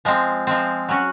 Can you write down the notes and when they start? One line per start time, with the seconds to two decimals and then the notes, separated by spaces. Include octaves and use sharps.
0.05 F3 G#3 C4
0.47 F3 G#3 C4
0.89 F#3 C#4 F#4